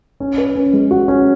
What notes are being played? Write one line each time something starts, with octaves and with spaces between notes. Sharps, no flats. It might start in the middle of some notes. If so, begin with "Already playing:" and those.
C#4
B4
C#4
G#3
F#4
C#4